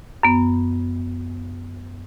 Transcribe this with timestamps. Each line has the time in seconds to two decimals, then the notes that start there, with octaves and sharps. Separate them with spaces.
0.23 F#2 B3